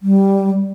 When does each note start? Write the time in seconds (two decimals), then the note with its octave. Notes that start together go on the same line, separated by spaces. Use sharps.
0.02 G3